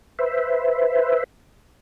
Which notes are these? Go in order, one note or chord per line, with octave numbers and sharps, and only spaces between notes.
B4 C5 E5